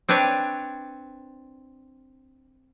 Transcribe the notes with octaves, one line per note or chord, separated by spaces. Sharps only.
C4 D4 B4 C#5